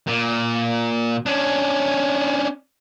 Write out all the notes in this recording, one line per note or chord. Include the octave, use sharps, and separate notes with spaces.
A#2
C#4 D4